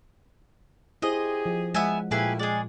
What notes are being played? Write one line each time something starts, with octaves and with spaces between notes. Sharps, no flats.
E4 G4 G#4 C5 D#5
F3
G#3 B3 E5 F#5 G#5
A#2 A3 A#3 E4 G4 G#4 B4
G#3 G#4 D5